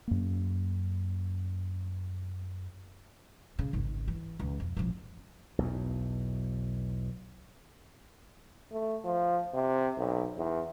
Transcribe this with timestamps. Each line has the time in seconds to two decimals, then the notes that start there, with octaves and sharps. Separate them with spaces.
0.08 F#2 A#3
3.59 C#3
3.73 G#1 C#2
4.08 E3
4.39 C#2
4.60 F2
4.77 A1 F3
5.58 B1 E2
8.72 A3
9.04 F3
9.54 C3
9.98 B1
10.37 E2